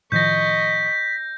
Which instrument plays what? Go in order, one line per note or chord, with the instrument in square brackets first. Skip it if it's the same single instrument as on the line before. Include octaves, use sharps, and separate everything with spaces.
[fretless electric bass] A2 D#3 F3 [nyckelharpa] D#5 C#6 [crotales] G6 A#6 [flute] B6